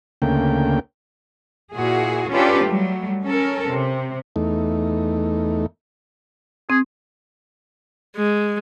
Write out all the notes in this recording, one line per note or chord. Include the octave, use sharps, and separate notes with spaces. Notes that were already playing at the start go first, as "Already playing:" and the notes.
D2 C#3 A3 A#3 G5
A#2 E4 F#4 G#4
C#4 D4 F4 G4 A4 B4
F#3 G3 A3
C#4 A4 A#4
C3
E2 A3 D#4
C4 G#4
G#3